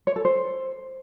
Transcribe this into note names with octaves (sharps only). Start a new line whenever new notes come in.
C#5
A4
C5